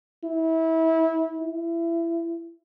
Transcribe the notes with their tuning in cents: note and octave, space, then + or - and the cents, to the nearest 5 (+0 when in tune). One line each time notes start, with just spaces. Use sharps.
E4 -25
E4 +25